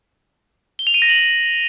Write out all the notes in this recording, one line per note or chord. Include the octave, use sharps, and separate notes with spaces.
G7
F7
D#7
A#6
F#7